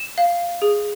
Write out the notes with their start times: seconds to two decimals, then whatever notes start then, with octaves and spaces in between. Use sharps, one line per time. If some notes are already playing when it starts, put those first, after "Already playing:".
Already playing: E7
0.18 F5
0.62 G#4